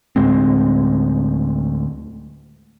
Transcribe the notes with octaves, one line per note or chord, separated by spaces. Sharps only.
D2 A2 G#3 C4